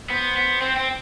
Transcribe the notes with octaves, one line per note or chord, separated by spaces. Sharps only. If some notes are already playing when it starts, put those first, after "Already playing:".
B3 C5
B3
C4
C4